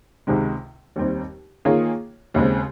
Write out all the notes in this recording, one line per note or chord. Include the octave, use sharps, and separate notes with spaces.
C#2 C3 D#3 G#3
D#2 D#3 G3 C4 D#4
D#3 A#3 F4 G#4 C#5
D#2 C#3 G#3 C4